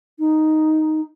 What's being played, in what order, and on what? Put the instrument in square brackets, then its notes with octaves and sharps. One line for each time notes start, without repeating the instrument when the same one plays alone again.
[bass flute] D#4